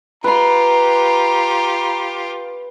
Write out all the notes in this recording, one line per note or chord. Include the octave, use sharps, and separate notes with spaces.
F4 G4 B4 A#5 B5